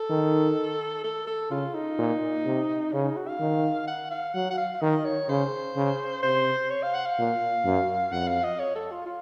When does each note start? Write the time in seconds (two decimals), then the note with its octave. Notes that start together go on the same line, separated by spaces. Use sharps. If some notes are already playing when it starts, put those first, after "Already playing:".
Already playing: A4
0.10 D#3
1.04 A4
1.27 A4
1.50 C#3 F4
1.74 D#4
1.99 A#2
2.45 C3
2.92 C#3 C#4
3.04 D#4
3.16 F#4
3.28 F5
3.40 D#3
3.88 F#5
4.11 F5
4.34 F#3 F#5
4.50 F#5
4.58 F5
4.74 F5
4.81 D#3 D#5
5.05 C#5
5.29 C#3 C5
5.76 C#3
6.23 C3 C5
6.70 C#5
6.82 F5
6.94 F#5
7.06 F5
7.18 A#2
7.65 F#2
8.12 F2 F#5
8.27 F5
8.44 D#5
8.59 C#5
8.75 A4
8.91 F4
9.06 F4